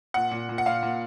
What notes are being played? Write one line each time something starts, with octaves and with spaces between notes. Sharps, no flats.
A#2 F#5
A#2
A#2
F#5
A#2 F5
A#2